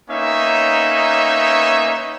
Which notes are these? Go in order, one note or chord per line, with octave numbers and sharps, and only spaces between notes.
A#3 B3 C#4 D#4 C#5 E5